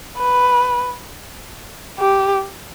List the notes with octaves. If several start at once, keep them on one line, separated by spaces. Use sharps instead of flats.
B4
G4